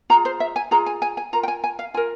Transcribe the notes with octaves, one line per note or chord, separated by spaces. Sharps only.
F4 G#4 A#5
C5
E5
G#5
F4 G#4 A#5
G#5
G#5
G#5
F4 A#4 A#5
G5
G#5
G#5
F5
F4 A#4 G#5